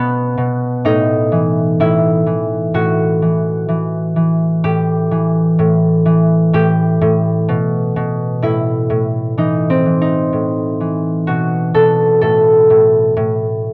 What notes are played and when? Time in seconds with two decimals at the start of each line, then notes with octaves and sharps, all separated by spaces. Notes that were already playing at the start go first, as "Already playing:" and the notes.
Already playing: B2 B3
0.38 B2
0.85 A2 D#4
1.32 E3
1.80 A2 E4
2.26 E3
2.74 A2 F#4
3.22 E3
3.69 E3
4.16 E3
4.64 A2 G4
5.11 E3
5.59 A2
6.06 E3
6.53 A2 G4
7.01 A2
7.49 B2
7.96 B2
8.42 A2 E4
8.90 A2
9.38 E3 D#4
9.70 C4
9.86 E3
10.02 D#4
10.33 A2
10.80 E3
11.27 B2 F#4
11.74 B2 A4
12.21 A2 A4
12.70 A2
13.17 A2